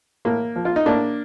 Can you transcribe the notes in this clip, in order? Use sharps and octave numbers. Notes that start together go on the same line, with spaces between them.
A2 A#3
F3
F4
D#4
A2 A#3 D4